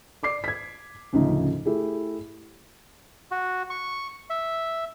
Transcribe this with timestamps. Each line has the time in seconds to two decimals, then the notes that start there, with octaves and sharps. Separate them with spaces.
0.23 D5 D6 C7
0.44 G#6 B6
1.13 A1 D2 C#3 F3 D#4
1.65 A3 E4 G4 G#4
3.31 F#4
3.70 C#6
4.30 E5